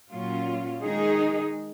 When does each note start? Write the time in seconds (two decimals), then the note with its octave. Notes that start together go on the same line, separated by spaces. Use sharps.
0.10 A#2 F#3 C#4 F4
0.81 D#3 G#3 D#4 G#4